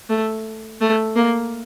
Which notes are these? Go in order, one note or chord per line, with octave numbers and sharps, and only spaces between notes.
A3
A3
A#3